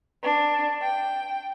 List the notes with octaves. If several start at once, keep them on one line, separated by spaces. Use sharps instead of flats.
D4
G5